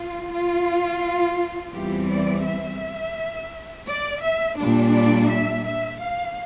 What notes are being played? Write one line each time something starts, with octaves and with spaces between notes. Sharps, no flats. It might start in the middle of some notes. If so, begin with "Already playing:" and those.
Already playing: F4
F4
E2 E3 G3 C4 G4
D5
E5
D5
E5
A#2 G3 D4
D5
E5
E5
F5